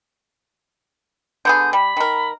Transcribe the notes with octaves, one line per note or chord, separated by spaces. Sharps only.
D3 B3 G#4 G6
G3 B5
D#3 A#4